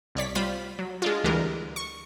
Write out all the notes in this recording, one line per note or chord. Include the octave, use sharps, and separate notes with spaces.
C2 C#5 D5 B6
G3 F4 C5 B5
F#3
G#3 D4 F4
D2 E3 G3 G#3 A#4
C#6